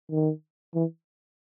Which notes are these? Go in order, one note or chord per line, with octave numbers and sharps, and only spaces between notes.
D#3
E3